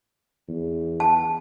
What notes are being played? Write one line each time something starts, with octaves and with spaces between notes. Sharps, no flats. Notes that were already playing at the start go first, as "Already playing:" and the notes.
E2
A5